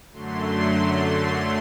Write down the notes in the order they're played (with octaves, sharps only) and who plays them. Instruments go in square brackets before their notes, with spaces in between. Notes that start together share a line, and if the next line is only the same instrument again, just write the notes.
[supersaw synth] F#2 D3 F#3 A3 C6